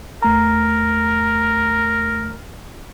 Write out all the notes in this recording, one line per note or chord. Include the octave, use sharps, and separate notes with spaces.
E2 A3 A#4 A#5